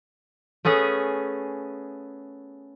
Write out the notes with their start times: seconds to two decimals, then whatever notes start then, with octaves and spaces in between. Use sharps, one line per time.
0.65 A3 B3 C#4 G#4